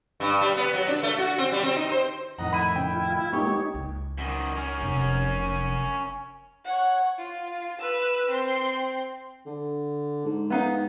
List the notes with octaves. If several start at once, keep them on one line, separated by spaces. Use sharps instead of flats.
G2
G3
B3
F#3
D4
A3
F#4
C4
G3
C4
D#4
C5
F2 A2 D#3 D#5 F#5 A#5
E4 B5 D#7
C#3 G5
F4
G#3 A#3 B3 D#4 G4 C#5
D#4
C#2
F#2 D#3
C#4 A#4
F1 C3
C#5 F#5
F4
B4 E6
C4 C6
D3
G#2
B3 D#4 F5